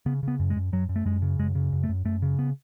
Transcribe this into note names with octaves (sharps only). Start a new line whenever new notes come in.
C#3 B3
C#3 B3
F#2
G#3
F#2
F#2 F#3
F#2
A3
F#2 G#3
C#3
F#2 G#3
C#3
F#2
A3
F#2
F#2 A3
C#3
B3